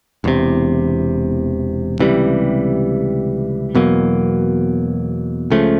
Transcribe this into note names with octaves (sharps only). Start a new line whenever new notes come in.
E1 E2 C3
C#2 C3 E3 G3
E2 B2 F#3 A#3
C#2 C#3 F3 A3